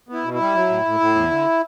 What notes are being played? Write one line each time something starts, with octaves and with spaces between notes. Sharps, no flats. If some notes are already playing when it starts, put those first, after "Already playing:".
B3 E4
B2
E4
G3
F#3
A2
A2
A2
E2
D3